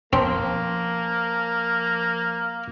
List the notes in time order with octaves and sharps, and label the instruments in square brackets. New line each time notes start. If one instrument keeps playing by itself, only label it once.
[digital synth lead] F3 [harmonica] A#3 [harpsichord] C4